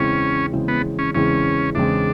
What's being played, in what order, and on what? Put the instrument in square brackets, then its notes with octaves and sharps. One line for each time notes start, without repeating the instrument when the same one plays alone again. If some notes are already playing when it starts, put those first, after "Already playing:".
Already playing: [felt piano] E2 C#3 E3 G#3 C4 [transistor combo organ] C#4
[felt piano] E2 C#3 E3 G#3 C4
[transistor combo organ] B3
C#4
[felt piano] E2 C#3 E3 G#3 C4 [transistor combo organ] C#4
[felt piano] E2 C#3 E3 G#3 C4 [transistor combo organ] D4